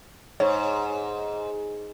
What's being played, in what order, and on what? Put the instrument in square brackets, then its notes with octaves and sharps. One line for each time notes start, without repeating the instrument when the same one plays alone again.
[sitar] G#2 [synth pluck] C#5